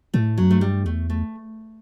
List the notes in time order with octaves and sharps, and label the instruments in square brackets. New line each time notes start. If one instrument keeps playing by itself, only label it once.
[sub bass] A2 [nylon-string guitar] A3
[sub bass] F#2 [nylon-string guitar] F#3
[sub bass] G2 [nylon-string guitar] A3
[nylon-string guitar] G3
[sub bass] E2 [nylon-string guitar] A3
[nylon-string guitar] A3